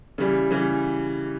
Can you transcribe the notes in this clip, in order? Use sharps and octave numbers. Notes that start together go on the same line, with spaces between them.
C#3 E3 G3
C#3 E3 G3